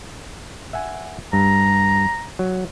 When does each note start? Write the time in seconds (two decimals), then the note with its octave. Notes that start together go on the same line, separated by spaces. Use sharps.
0.73 E5 F#5 G#5
1.33 G2 A#5
2.39 F#3